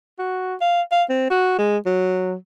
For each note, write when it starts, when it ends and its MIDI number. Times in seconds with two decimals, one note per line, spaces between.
0.19 0.55 66
0.61 0.82 77
0.92 1.03 77
1.09 1.30 60
1.30 1.57 66
1.59 1.77 56
1.86 2.35 54